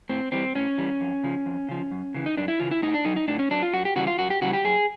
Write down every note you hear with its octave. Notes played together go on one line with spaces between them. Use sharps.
A2 C4
E3 G3 C4
A2 C#4
E3 G3
F2
C#3 F3
F2
C#3 F3
F#2
C#3 E3
D#4
F#2 D4
E4
C#3 E3 F4
E4
A2 D#4
D4
F#3 D#4
D#4
A2 D4
C#4
F#3 D4
F4
F#2 F#4
G4
C#3 E3 G3 F#4
F4
F#2 F#4
G4
C#3 E3 G3 F#4
G4
F#2 G#4